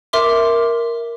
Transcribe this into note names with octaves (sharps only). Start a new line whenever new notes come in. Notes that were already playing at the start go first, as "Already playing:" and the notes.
A#4 E5 C6 D6